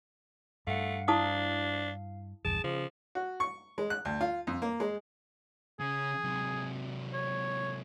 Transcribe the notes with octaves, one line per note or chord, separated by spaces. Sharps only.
G2 A3 F5 F#5
D4 E4 F5 A5 D#6
A#1 E2 G2 G#4 A5
C#3 F3
F#4
C#6
G#3
F#6
D2
F4
F2
A#3
G#3
C#3 G#4
C3 F#3
C#5